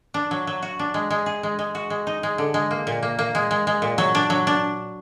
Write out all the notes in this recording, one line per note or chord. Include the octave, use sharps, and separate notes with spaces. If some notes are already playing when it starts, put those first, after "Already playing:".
D4
F#3
F#3
F#4
D4
G#3
G#3
G#4
G#3
G#3
F#4
G#3
D#4
G#3
D3
G#3
A#3
A#2
A#3
A#3
G#3
G#3
G#3
A#2
F#3
D4
F#3
D4